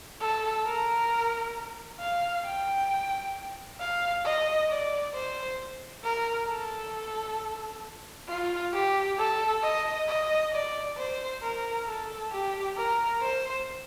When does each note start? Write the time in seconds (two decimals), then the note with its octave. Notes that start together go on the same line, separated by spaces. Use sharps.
0.20 A4
0.66 A#4
2.00 F5
2.45 G5
3.80 F5
4.24 D#5
4.70 D5
5.14 C5
6.03 A#4
6.49 A4
8.28 F4
8.73 G4
9.18 A4
9.63 D#5
10.08 D#5
10.53 D5
10.97 C5
11.43 A#4
11.87 A4
12.32 G4
12.77 A#4
13.21 C5